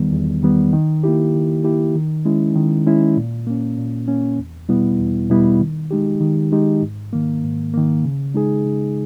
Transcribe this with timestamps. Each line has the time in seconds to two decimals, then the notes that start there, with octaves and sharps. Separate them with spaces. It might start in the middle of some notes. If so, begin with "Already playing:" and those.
Already playing: E2 D#3 G3 B3
0.12 E2
0.43 D#3 G3 B3
0.73 D#3
1.04 A#3 E4 G4
1.34 D#3
1.64 A#3 E4 G4
1.95 D#3
2.25 G#3 C#4 E4
2.56 D#3
2.86 G#3 C#4 E4
3.17 A#2
3.47 A#3 C#4
3.78 A#2
4.08 A#3 C#4
4.38 E2
4.69 B2 G3 B3 E4
4.99 E2
5.30 B2 G3 B3 E4
5.61 D#3
5.91 G#3 D#4 G4
6.21 D#3
6.52 G#3 D#4 G4
6.82 G#2
7.13 D#3 A#3
7.44 G#2
7.74 D#3 A#3
8.04 C#3
8.34 G#3 D#4 G#4
8.65 C#3